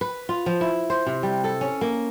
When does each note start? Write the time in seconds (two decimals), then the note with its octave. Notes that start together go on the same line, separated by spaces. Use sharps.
0.01 B4
0.29 F4
0.46 F3
0.61 E4
0.90 C5
1.07 C3
1.23 G3
1.44 A4
1.61 C#4
1.81 A#3